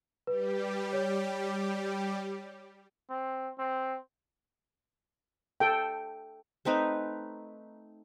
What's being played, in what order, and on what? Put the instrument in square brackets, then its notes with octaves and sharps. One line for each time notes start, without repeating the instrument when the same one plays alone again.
[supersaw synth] G3 G4 [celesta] B4
[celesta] C#5
[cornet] C4
C4
[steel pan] A4 G5
[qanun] A3 C4 D#4 B4